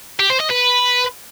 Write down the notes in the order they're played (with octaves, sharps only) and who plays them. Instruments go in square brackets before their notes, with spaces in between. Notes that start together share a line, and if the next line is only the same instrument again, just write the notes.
[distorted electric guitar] G4
C5
D#5
B4